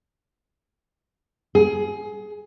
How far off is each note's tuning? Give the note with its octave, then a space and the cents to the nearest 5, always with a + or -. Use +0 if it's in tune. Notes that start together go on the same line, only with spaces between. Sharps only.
G#4 +20